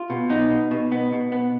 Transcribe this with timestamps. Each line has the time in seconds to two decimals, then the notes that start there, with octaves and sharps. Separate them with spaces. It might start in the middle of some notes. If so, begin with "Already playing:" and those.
Already playing: F4
0.10 B2
0.30 B3 D#4
0.50 B2
0.71 B2
0.92 B3
1.12 B2
1.32 B3